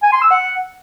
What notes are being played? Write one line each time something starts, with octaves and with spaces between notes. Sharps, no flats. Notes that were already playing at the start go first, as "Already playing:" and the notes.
G#5
C6
E6
F#5